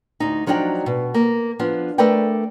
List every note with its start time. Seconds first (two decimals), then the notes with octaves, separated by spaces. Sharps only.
0.20 D2 D#4
0.46 F3 F#3 D4 D#4 D5 G5
0.86 B2
1.14 A#3
1.59 F3 B3 D4
1.98 A3 A#4 B4 D5 G5